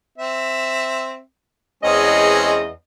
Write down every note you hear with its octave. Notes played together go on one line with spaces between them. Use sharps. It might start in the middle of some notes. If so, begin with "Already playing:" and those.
C4 E5
E2 G#3 C4 C#4 D#5